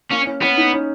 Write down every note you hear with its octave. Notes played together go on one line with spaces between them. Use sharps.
A#3 C#4
C#4
B3 C#4
D#4
C#4